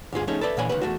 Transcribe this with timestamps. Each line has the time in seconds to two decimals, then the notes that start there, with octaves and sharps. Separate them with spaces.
0.12 D2 G2 F4 G#4
0.27 F3 A3 C#4 D#4 G#4
0.41 A4 B4 D5 E5
0.57 A#2 D3 E3 C#5 G#5 B5
0.69 C#2 D#3 B4
0.81 E2 A3 F#4